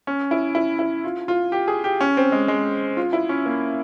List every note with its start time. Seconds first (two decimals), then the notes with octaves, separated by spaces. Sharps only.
0.07 C#4
0.31 E4
0.55 E4
0.79 E4
1.04 F4
1.28 F4
1.52 G4
1.68 G#4
1.84 G4
2.01 C#4
2.17 C4
2.32 G#3
2.48 G#3
2.97 F4
3.13 E4
3.29 C#4
3.46 A#3